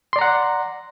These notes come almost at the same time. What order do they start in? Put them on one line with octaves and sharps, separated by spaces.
C6 D5 A#5 F#5